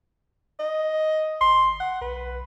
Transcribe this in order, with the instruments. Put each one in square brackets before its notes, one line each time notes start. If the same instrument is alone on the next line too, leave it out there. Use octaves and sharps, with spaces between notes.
[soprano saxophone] D#5
[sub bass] G1 [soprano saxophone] C6
[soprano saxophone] F#5
[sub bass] B1 [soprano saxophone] B4